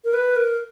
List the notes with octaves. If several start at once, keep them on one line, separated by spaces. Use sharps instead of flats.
A#4
B4
A#4